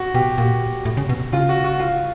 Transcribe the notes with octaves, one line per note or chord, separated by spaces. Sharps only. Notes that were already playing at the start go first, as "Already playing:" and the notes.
Already playing: F#4
B2 G4
A#2 F#4
A2
C#3
B2
C#3 F4
F#4
F#4
F4